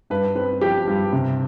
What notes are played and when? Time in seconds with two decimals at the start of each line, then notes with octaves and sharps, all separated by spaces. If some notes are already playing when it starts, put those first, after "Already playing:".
0.10 G2 B4
0.35 C4 B4
0.61 F3 G4
0.87 G2
1.13 C3